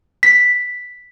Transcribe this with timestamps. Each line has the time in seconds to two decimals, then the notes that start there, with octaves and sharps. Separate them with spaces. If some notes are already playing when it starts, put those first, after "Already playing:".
0.23 B6